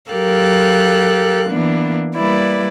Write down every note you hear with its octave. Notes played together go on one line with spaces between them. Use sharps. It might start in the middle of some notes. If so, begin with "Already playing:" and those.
F#3 G4 A4 A#4 F5 F#6
E3 A#3 B3 D4
G3 A#3 E4 B4 D5